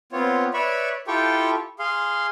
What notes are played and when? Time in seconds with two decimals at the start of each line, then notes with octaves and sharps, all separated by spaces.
0.13 B3 C4 F4 C#5
0.54 B4 C#5 D5 E5 B5 C#6
1.07 E4 F4 G4 A4 G5 C#6
1.79 G#4 F5 C6